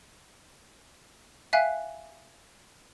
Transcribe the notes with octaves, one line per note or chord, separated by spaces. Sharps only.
E5 F5 G5 G#5 F#6 B6